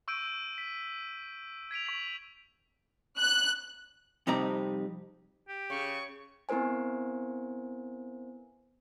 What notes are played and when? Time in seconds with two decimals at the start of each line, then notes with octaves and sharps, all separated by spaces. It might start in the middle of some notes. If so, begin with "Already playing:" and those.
0.08 C#6 E6 G6 D7 D#7
0.58 B6
1.71 G#6 B6 D7 F7
1.85 C#6 B6 F#7
3.18 F#6
4.27 F2 C3 G3 C4 D#4 A#5
5.49 G4
5.70 C#3 C#6
6.49 B3 C4 E4 A#4 C5 G#5